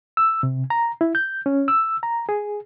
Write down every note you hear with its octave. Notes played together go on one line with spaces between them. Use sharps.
E6
C3
A#5
E4
G6
C#4
E6
A#5
G#4